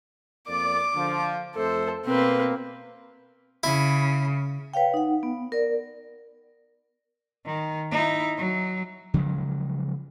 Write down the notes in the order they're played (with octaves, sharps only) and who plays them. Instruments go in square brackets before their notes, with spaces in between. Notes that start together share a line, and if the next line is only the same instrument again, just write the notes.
[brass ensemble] F2 A#3 D5 [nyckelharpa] D6
[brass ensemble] D3 F3
[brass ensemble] F2 A3 C5 [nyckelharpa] A4
[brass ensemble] B2 A#3 [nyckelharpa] C4 B4
[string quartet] C#3 [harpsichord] E4
[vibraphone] B4 C#5 F5 G5
D#4 F#5
B3
A#4 D5
[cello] D#3
D#4 E4
F#3
[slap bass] C#3 F3 F#3 G#3